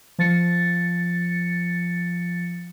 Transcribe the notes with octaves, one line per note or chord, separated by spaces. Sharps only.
F3 A6 C#7